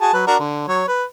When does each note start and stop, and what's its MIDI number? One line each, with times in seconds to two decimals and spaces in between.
0.01 0.13 66
0.01 0.13 68
0.01 0.13 81
0.13 0.26 54
0.13 0.26 71
0.27 0.36 62
0.27 0.36 66
0.27 0.36 70
0.39 0.66 50
0.67 0.83 54
0.67 0.83 73
0.88 1.04 71